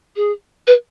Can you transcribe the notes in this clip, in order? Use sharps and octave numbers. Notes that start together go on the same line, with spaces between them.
G#4
B4